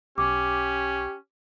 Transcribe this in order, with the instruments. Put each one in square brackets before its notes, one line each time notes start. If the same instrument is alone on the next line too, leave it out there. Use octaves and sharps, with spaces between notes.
[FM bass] B1 [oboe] C#4 [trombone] G4 [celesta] D6